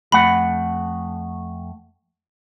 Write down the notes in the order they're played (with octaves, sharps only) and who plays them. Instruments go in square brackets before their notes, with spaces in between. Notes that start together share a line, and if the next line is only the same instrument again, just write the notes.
[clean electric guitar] F2 A3 F#5 [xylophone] B5